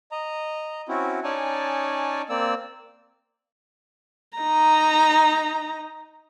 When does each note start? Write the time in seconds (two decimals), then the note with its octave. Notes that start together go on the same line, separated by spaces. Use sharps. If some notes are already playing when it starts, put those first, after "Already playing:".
0.12 D#5 A#5
0.88 C4 C#4 E4 F#4
1.24 C#4 D#4 C#5 D5 G#5 A5
2.29 A#3 C4 D5 E6
4.38 D#4 A#5